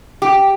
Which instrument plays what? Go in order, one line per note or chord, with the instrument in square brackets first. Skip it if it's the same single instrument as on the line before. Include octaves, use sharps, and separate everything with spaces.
[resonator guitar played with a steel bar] G4